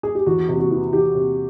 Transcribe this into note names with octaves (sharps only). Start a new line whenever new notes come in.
G#4
G4
E2 F#4
C3
F#4
E3
E3 G4
C3